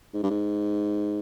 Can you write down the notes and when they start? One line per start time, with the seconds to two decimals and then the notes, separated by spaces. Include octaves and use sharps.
0.14 G#2
0.23 G2
0.30 G#2